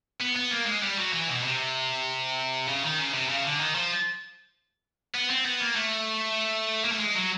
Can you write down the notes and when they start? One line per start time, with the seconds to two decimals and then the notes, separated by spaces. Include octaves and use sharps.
0.20 B3
0.36 B3
0.51 A#3
0.66 G#3
0.83 G3
0.98 F#3
1.13 E3
1.28 B2
1.44 C3
2.68 C#3
2.83 D#3
2.98 C#3
3.14 C3
3.29 C#3
3.44 D3
3.60 D#3
3.75 F3
5.14 B3
5.30 C4
5.45 B3
5.61 A#3
5.76 A3
6.84 A#3
6.92 A3
7.00 G#3
7.15 F#3